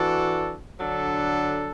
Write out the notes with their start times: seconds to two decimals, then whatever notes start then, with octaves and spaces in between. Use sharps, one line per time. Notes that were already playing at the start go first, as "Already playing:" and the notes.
Already playing: E3 D4 F#4 A4
0.80 D3 F#3 D4 A4